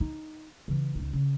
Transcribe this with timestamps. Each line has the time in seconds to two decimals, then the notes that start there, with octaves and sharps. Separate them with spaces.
0.01 D#4
0.68 C#3 E3
0.95 C#2 D#4
1.13 C#3